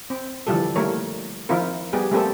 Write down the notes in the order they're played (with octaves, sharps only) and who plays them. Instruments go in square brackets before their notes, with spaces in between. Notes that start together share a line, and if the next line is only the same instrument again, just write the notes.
[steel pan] C4
D3 E3 F3 G3 G4 A4
D#3 G3 A3 A#3 A#4 C#5
D#3 F3 C4 E4 F4 A#4
G3 B3 G4 G#4
G3 A3 A#3 C4 G4 A4